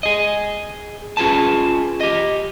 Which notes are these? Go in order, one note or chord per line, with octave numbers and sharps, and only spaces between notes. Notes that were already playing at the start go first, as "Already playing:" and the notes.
G#4 D#5
C#4 F4 G#4 B4 A5
G4 D#5